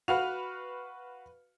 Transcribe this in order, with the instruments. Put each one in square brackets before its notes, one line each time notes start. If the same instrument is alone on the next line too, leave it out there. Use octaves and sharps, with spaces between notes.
[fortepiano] F#4 F5 F#5 [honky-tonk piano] B4 F6 F7